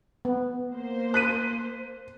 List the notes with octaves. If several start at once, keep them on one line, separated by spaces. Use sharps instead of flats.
B3
A#3 C5
F#6 B6 D#7